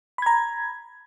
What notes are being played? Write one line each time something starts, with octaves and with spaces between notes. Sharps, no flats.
A#5 B5 G#6